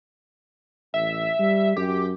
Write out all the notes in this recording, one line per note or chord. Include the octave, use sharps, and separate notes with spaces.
A1 E5
G3
F#2 G4